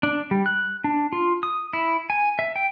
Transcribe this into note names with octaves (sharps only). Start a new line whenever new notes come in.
D4
G3
F#6
D4
F4
D#6
E4
G#5
E5
G5